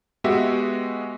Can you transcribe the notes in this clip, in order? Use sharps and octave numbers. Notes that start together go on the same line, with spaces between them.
G#3 B3 F#4 G4 E5